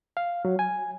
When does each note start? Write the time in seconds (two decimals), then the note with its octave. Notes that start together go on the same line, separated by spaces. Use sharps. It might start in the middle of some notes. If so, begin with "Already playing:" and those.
0.17 F5
0.45 F#3
0.59 G#5